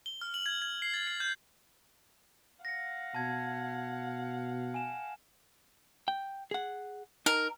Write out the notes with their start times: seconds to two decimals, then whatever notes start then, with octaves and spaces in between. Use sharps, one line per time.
0.06 G7
0.21 F6
0.34 F#7
0.46 G#6
0.62 G#6
0.82 C7
0.94 A6
1.07 C7
1.20 G6
2.65 F5 F#5 A#6 C#7
3.15 B2 A5 G#6
4.74 G#5 E7
6.08 G5
6.51 G#4 F#5
7.26 D#4 A#4 A#5